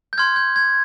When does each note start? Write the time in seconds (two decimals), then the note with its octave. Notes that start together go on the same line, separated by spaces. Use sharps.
0.13 G6
0.18 C6 F6 G#6
0.36 G6
0.56 G#6